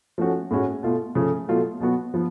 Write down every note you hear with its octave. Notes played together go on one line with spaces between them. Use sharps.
F3 A3 C#4 F#4
A2 G#3 C#4 F#4
B2 A3 F4
C#3 F3 A3
B2 F#3 A3 F4
B2 F#3 B3 F#4
F3 B3